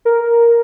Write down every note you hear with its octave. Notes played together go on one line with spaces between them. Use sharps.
A#4